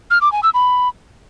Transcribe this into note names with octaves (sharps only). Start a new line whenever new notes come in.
F6
D6
G#5
E6
B5